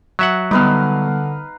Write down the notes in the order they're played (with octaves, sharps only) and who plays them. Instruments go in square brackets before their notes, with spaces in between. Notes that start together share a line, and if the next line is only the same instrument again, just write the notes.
[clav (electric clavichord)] F#3 E5 F#5
[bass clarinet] D3 [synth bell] G3 B3 [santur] D#4 B4 F5